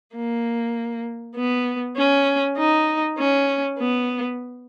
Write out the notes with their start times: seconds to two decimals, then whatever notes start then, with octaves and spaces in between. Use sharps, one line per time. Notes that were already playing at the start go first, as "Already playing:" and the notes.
0.16 A#3
1.36 B3
1.97 C#4
2.58 D#4
3.18 C#4
3.79 B3